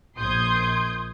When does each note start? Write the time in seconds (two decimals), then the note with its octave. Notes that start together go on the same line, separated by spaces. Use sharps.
0.16 A#1 C6 D#6 G6 G#6